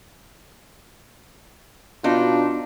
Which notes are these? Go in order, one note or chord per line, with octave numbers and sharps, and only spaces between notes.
B2 D4 D#4 F4